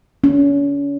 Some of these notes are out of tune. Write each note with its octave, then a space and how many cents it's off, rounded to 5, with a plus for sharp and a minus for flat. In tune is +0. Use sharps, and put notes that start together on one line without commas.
C#4 +35